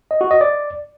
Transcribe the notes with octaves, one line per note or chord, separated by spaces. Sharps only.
D#5
F#4
D#5
D5